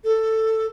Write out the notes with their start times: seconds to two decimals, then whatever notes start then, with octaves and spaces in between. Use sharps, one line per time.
0.04 A4